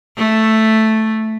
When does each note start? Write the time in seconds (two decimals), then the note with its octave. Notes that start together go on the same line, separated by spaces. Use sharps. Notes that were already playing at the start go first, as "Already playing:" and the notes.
0.17 A3